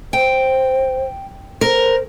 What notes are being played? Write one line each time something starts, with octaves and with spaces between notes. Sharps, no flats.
C5 G5
A#4 C5